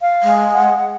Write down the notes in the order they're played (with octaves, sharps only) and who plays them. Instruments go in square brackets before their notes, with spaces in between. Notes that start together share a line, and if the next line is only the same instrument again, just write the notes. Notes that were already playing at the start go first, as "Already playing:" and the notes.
[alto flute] F5
[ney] G#3
[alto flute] F#5